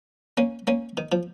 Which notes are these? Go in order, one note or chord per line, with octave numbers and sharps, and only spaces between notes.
A#3 C#4
A#3 C#4
D#3
F3